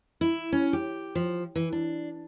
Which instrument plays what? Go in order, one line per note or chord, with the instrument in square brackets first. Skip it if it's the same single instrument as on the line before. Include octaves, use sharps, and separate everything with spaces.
[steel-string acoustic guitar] E4
C#4
G4
F3
E3
D4